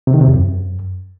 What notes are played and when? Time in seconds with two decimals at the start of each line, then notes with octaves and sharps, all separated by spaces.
0.07 C3
0.14 D#3
0.21 C3
0.28 E2
0.35 F#2